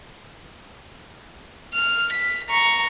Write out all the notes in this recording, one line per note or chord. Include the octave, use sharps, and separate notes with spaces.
F6
B6
A#5 C#6